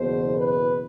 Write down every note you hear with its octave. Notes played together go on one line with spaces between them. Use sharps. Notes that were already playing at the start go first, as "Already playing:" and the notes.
Already playing: F#1 E2 B2 C5
B4